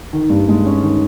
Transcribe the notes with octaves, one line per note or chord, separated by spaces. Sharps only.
D#3
G2
G#3
C#4
D#3